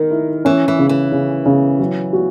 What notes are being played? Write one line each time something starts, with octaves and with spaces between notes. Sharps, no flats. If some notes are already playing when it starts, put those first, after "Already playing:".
Already playing: D#3 A#4
E4
E3 C#4
E3
C#3
E3
C#3
C#3
F#3
F#4